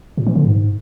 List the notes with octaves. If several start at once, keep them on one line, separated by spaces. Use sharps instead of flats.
A#2
E3
D3
G#2